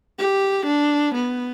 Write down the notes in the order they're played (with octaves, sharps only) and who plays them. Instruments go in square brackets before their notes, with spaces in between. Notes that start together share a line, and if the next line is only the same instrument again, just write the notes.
[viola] G4
D4
B3